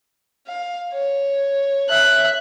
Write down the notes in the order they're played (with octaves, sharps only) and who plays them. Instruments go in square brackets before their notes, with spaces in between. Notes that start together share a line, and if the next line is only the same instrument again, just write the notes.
[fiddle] F5
C#5
[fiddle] C#5 [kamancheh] E5 F#6